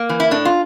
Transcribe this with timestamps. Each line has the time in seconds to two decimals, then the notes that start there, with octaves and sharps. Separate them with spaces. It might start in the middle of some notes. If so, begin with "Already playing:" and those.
Already playing: A#3
0.09 E3
0.20 E4
0.31 A2 D4
0.45 F4